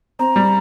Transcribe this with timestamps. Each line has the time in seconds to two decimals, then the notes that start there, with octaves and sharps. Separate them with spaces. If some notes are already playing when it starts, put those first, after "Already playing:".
0.19 C4 A#5
0.36 G3